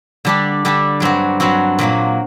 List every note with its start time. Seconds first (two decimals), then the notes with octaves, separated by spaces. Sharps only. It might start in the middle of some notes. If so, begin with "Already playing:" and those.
0.25 D3 G3 D4 G4
0.65 D3 G3 D4 G4
1.00 G2 F#3 C4 F#4
1.40 G2 F#3 C4 F#4
1.79 A#2 F#3 A#3 F#4